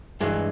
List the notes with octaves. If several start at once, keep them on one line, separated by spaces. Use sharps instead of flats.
G2 E3 G#3